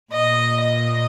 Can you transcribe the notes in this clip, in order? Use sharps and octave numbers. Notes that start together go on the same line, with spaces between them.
A#2 D#5
D#5